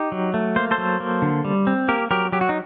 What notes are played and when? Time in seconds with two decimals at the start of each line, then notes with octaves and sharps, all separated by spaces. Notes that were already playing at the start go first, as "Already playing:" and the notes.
Already playing: D#4 G4
0.12 F#3
0.34 A3
0.56 A#3 C5
0.71 A4 C5
0.78 F#3
1.00 A#3
1.22 D3
1.44 G3
1.67 C4
1.88 A#3 G4 A#4
2.11 F#3 G4 A#4
2.32 F#3 G4
2.41 F#4
2.49 D#4